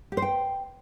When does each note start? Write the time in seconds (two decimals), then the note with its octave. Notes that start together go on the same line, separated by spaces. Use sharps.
0.12 G4
0.17 C5
0.22 G5